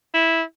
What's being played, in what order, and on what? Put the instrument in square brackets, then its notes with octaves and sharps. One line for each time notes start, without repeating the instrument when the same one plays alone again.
[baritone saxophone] E4